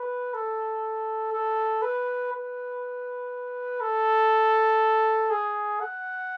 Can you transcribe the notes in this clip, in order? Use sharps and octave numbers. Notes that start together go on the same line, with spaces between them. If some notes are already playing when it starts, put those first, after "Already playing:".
Already playing: B4
A4
A4
B4
B4
A4
G#4
F#5